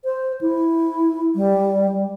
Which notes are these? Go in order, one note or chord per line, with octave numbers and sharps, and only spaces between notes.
C5
E4
G3